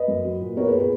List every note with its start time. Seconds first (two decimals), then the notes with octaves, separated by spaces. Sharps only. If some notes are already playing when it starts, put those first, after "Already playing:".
Already playing: B4 D#5
0.08 F#2
0.25 F#3
0.40 A#2
0.57 B3 A#4 C#5
0.67 G#4 B4
0.73 A#2
0.78 G#4 B4